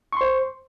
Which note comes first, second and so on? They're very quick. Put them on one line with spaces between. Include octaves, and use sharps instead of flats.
C#6 C6 C5